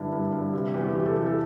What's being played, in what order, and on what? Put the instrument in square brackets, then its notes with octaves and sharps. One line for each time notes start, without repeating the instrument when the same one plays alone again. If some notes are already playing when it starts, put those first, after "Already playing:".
Already playing: [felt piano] G2 D3 D4 E4
G2
G2
C3
E2
C3 G4
A4
E3 G4
A4